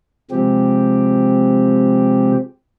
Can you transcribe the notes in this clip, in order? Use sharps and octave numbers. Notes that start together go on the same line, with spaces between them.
C3 F3 G#3 C4 G4